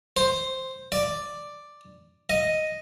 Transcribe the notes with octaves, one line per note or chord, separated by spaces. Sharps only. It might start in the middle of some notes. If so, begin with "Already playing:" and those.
C5
D5
D#5